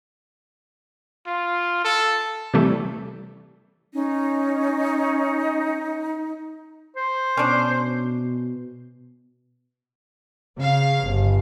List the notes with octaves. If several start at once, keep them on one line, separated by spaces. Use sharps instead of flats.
F4
A4
C3 E3 G3 A3
C#4 D#4
C5
B2 C#4 D4
C#3 F5
G1